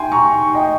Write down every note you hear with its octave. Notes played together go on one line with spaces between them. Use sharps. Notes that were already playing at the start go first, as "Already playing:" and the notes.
Already playing: G5 G#5 C6
A#5 C#6
D#5 G5